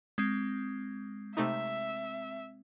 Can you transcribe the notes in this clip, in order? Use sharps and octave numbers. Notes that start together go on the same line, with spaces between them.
G#3 C4
C3 A3 D#4 E5